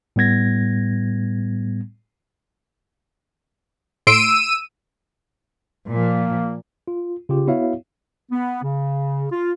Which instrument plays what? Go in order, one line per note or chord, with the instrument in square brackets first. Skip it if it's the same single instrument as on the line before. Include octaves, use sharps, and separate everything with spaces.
[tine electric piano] A2 G3 B3 G#6 A#6
[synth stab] A2 C6 D7 [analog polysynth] E6 D#7
[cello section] A#2 F3 [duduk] A#3
[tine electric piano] F4
C#3 F4 G4
B3 E4 F#4 C#5 E5 F5
[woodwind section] B3
C#3
F4